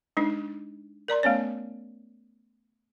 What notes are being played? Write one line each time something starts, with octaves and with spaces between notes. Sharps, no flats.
G#3 D4 D#4
A#4 D5 A#5 C6
A3 B3 C#4 C#5